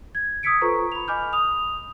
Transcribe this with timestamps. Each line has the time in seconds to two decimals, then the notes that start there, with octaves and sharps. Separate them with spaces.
0.15 G#6
0.43 D#6 E6 G#6 B6 C#7 D7
0.61 F4 A4 B4 C5 A#5 C#6
0.92 B5 F7
1.08 D#5 G#5 B5 D6 F6 G6
1.33 D#6 F7